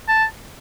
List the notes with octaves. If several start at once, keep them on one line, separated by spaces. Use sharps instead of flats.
A5